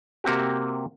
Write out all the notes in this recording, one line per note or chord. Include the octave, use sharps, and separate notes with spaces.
C3 A#3 C4 F#4 G4